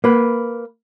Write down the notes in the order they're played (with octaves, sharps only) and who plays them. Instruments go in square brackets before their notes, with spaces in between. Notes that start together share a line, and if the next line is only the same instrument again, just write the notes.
[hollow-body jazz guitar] A#3 B4